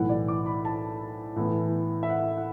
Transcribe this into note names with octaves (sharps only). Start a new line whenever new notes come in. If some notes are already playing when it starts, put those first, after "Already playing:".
Already playing: B1 A2 E3 F#5
D5
D6
B5
A5
A2 E3 B3
E5
F#5
F#5